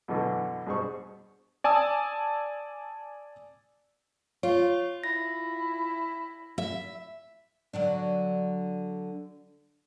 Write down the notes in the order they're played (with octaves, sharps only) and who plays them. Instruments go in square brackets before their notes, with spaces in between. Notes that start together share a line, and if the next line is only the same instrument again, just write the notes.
[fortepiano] F#2 B2 D3 E3
G2 B2 G#4 C5 C#6
[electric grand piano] D5 G#5 A5 D#6 E6
[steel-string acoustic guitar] F4 [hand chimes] C#5
[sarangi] E4 [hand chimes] A#6
[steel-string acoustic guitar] E5
[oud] D3 F#3 D4